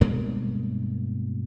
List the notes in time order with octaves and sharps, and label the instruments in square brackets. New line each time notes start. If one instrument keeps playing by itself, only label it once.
[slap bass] G2 B2 G#3 A#3